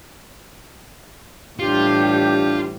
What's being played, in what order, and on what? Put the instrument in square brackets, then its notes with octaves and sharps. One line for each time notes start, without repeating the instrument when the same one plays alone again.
[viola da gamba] A2 E3 G3 [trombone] D4 [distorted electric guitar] F4 [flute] G4